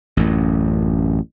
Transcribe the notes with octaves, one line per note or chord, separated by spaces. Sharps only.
A1 F#2